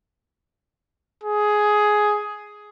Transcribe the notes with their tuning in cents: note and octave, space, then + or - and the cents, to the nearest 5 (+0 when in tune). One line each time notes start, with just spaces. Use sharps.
G#4 +10